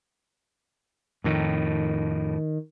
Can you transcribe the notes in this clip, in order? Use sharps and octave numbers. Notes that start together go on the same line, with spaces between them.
F2 A2 D#3